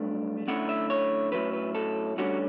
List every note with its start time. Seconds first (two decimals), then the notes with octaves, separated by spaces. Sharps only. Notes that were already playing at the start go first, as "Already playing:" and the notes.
Already playing: G2 F#3 A3 D4
0.47 F#2 D3 A3 C#4 E4 F#5
0.69 E5
0.90 C#5
1.32 A2 F#3 C#4 E4 B4
1.53 B4
1.75 A4
2.17 D2 D3 G3 C#4 F#4